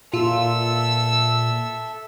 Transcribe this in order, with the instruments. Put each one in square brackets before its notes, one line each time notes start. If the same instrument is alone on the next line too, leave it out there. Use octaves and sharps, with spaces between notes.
[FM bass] A#2 [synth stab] F4 [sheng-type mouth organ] A4 E5 [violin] E6